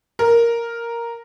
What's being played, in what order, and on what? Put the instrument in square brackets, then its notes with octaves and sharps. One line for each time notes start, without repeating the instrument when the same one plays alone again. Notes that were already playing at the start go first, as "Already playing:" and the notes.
[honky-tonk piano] A#4